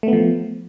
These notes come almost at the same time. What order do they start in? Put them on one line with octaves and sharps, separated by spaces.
A3 B3 F3